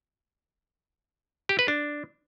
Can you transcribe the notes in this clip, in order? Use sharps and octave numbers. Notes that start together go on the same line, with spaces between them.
G4
B4
D4